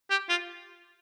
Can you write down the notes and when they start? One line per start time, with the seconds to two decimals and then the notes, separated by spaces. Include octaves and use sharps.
0.10 G4
0.29 F4